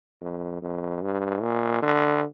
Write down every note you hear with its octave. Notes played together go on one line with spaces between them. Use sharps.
F2
F2
G2
A#2
D3